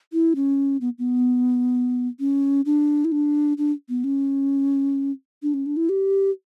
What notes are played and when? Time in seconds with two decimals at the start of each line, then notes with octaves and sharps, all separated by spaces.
0.13 E4
0.36 C#4
0.81 B3
0.99 B3
2.20 C#4
2.66 D4
3.05 E4
3.12 D4
3.58 D4
3.89 B3
4.04 C#4
5.43 D4
5.54 C#4
5.66 D4
5.77 E4
5.89 G4